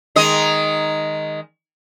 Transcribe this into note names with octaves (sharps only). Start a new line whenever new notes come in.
D#3 G#3 D#5